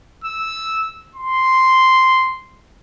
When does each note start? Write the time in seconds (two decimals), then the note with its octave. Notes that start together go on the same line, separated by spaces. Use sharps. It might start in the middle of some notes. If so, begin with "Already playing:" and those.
0.24 E6
1.15 C6